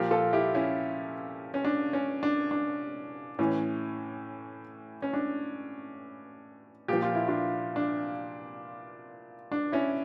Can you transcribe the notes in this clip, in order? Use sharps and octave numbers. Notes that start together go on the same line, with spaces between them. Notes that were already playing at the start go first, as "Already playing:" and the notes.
Already playing: A#2 F3 G4 A#4
F4 A4
E4 G4
C#4 E4
C#4
D4
C#4
D4
D4
A2 E3 C#4
C#4
D4
A#2 F3 G4
F4
E4
D4 F4
D4
D4
C#4 E4